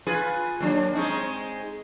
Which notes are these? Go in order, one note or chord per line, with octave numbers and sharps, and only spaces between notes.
F4 G#4 B4
D#2 F#3 D4
G#3 C4 D#4